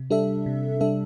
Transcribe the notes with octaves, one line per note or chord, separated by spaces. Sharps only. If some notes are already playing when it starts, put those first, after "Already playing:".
Already playing: C3
G3 D4 A4 E5
C3
G3 D4 A4 E5